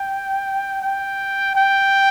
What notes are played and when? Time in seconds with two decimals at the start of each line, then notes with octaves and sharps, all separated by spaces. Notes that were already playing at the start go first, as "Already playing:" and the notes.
Already playing: G5
0.82 G5
1.56 G5